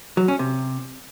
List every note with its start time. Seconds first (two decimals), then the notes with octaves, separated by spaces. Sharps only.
0.17 F#3
0.28 C#4
0.39 C3